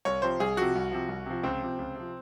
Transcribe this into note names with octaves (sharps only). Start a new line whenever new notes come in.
C2 C#5
C3 F3 C5
C2 G#4
C3 F3 F#4
C2
C3 F3
C2
C3 F3
C#2 C4
C3 F3
C#2
C3 F3